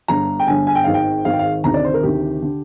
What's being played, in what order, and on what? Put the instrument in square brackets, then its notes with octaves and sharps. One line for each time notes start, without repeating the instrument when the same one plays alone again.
[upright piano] G1 G2 D3 A#5
G5
G1 G2 D3 G#5
G#5
G5
G#1 G#2 D#3 F5
G5
G#1 G#2 D#3 F5
G5
F5
D2 C3 D#3 A#5
D5
C5
A#4
D2 C3 D#3 G4
D3